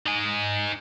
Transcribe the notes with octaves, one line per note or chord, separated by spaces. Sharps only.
D#4 G#5